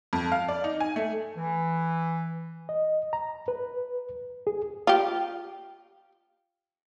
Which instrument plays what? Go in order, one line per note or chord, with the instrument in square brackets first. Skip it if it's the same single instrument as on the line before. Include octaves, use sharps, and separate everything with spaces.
[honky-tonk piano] F2
F5
D5
D#4
G#5
A3
[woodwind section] E3
[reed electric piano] D#5
A#5
B4
G#4
[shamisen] F4 G4